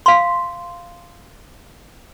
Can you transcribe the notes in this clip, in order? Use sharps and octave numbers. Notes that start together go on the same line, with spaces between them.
F5 C6